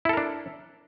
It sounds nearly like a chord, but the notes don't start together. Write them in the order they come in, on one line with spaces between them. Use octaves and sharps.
E4 A4 A#4 D4